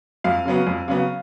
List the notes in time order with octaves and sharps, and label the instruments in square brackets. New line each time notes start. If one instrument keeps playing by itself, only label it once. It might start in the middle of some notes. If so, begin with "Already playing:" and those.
[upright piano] F2 F5
C#3 F#3 B3
F2
C#3 F#3 B3